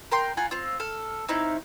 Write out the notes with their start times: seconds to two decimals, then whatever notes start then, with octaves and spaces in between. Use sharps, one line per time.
0.12 A#4 G5 C6
0.37 F4 F#5 G#5 A#5
0.51 C4 F4
0.80 A4 F6
1.28 C4 C#4 D#4 E4